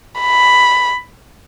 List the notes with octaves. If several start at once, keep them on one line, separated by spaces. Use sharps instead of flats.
B5